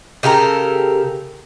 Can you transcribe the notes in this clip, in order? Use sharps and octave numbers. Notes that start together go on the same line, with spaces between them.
C#3 G4 A4 A#4